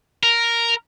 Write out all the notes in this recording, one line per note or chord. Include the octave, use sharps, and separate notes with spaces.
A#4